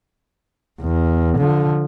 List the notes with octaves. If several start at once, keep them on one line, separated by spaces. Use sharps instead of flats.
E2
D3 F3